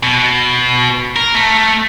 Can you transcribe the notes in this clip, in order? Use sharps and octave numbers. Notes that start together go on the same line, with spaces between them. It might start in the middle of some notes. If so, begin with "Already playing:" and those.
B2
A#4
A3